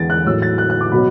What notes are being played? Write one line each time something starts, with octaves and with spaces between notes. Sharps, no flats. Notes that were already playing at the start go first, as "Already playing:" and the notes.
Already playing: E2 E3 A6 D7
F#6
A2 F#3 E6
A6
F#6
F#6
D6
B2 F#3 B5